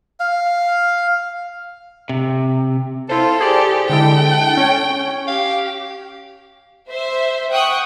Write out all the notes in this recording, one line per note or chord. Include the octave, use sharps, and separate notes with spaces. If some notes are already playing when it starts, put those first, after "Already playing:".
F5
C3
E4 F4 A4 C5
G4 G#4 C5 D5
D3 G#3 E4 A4 G5
C#4 C#5
G4 F5
C5 E5
F#5 G5 C#6 D#6 F#6